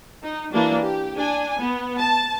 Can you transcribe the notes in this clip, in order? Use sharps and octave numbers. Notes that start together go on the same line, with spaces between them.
D#4
E3 A#3 D4 F#4
G4
D4 G#5
B3
A5